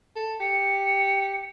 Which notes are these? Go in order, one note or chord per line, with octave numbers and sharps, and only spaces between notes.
A4
G4 C#7